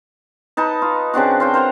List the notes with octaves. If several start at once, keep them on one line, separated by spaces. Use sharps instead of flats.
D#4 B4 A5
F4
C#3 C4 D4 F#4
F4 C5 G5
A#4 C5 F#5 A#5